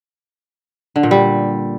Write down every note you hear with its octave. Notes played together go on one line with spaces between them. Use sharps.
D3
A#2
G3